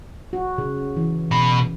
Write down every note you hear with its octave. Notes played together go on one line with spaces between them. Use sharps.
F#4
C#3
E3
B2 B5